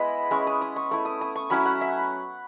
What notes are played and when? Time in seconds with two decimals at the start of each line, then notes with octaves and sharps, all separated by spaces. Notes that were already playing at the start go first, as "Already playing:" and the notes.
Already playing: G#3 B3 E4 D#5 B5
0.31 G#3 C#4 E4 C#6
0.47 D#6
0.62 D#6
0.76 C#6
0.91 A3 E4 C#6
1.05 D#6
1.21 D#6
1.36 C#6
1.50 F#3 C#4 E4 B5
1.66 F#5
1.81 E5